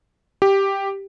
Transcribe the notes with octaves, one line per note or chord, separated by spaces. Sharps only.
G4